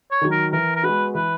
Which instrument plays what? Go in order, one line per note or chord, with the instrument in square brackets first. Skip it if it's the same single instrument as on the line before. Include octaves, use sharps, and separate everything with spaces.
[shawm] C#5
[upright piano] D#3 F#3
[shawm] A#4
[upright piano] E3 [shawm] A#4
[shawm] A#4
[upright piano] G#3 B3 F#4 [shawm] B4
[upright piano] E3 [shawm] B4